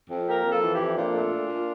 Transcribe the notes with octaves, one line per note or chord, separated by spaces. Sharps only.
F2
A#3 G4 A#4
F2
F4 A4
E3
E4 G4
F2
A#2 D4 F4
A3
A#2
A#2